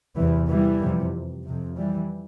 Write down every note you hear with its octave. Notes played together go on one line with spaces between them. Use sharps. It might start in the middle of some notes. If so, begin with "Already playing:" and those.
E2 C3 E3 G3
E3 G3
F2 C3
F2 C3
E3 G3